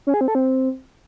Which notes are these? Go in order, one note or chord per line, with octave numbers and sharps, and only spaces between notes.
C#4
G#4
C4
A4
C4